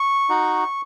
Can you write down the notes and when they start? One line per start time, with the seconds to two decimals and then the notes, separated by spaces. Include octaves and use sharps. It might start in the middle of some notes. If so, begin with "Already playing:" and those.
Already playing: C#6
0.29 D#4 F#4